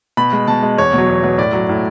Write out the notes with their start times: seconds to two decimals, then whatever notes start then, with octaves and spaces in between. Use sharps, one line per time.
0.17 B2 B5
0.33 G#3
0.48 B2 A5
0.63 G#3
0.78 E2 C#5
0.93 B2 F#3
1.09 E2
1.23 B2 F#3
1.38 A2 D5
1.53 F#3
1.69 A2